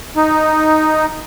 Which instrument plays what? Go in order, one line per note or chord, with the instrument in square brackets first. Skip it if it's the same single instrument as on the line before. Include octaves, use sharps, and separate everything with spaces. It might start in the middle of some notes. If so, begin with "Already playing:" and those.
[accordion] D#4